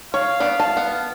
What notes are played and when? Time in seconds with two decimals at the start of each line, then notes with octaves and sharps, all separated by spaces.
0.14 C#5 F5
0.40 B3 D4 B5
0.60 A5
0.77 B3